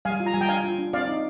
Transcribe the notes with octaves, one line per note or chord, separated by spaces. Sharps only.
G3 F5 G#5
F4
A#5
G3 G#5
G5 A#5
D4 F5 G#5
F4
D4
C4 D5 F5
D#4